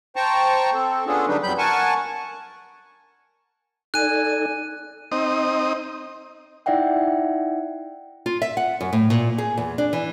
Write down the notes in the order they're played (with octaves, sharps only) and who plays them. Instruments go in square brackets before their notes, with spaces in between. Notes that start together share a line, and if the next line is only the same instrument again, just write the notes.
[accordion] C5 G5 A5 A#5 C#6
C4 A4
B3 C#4 D4 F4 G#4 A4
D3 F#3 G3 D4 D#4 B4
F2 F#3 G3 B5 G6
A#4 F#5 G#5 A5 C#6
[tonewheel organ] D#4 A4 D5 [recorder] G#5 [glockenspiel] F#6 D#7
[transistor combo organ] C4 D#4 D#6
[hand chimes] D#4 E4 D5 E5 F#5 G5
[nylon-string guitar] F4
E5
F#5
F#2
A2
A#2
G#4
E2
D4
E3